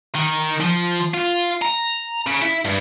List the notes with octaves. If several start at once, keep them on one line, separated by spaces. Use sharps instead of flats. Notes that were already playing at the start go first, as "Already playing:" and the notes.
D#3
F3
F4
A#5
C#3
E4
G2